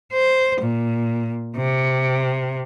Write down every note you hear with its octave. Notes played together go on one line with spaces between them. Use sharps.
C5
A#2
C3